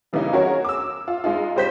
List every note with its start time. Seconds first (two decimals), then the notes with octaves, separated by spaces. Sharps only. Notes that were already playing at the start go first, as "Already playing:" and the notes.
0.13 C#3 E3 G3 A#3 D#4
0.33 C#4 F#4 G#4 A#4 C#5
0.64 D6 E6
1.08 F4
1.24 G#3 D#4 F4
1.56 G3 G4 C5 G6 B6